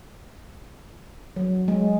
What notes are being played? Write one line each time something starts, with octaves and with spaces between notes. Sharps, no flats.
F#3
G#3